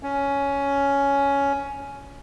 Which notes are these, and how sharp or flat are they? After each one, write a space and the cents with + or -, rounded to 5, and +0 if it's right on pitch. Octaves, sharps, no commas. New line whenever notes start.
C#4 +10